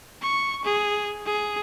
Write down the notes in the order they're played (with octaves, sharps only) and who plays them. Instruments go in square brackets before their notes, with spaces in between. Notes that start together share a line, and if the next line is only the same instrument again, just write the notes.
[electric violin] C#6
G#4
G#4